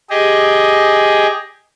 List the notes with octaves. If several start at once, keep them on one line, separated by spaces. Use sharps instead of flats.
G4 G#4 D#5